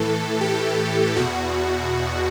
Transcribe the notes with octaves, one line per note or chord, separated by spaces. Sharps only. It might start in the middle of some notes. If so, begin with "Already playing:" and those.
Already playing: A2 E3 A4
G4
E2 B2 F#4